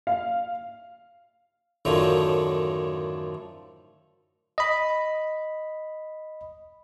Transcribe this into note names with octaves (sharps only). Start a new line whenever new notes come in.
F5
F#2 A2 D3 D#3 F3
D#5 B5